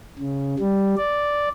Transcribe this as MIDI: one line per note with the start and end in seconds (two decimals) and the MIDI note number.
0.19 0.55 49
0.59 0.95 55
0.97 1.48 74